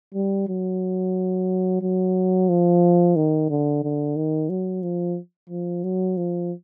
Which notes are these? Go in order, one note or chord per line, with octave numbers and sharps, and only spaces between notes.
G3
F#3
F#3
F3
D#3
D3
D3
D#3
F#3
F3
F3
F#3
F3